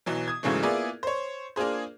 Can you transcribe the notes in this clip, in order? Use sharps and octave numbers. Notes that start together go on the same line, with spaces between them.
B1 E3 F#3
D#6 G#6
G#2 C#3 E3 F#3 G#3 A3
A#3 B3 E4 F4 G#4 D5
C5 C#5
A#3 D4 F4 G#4 C5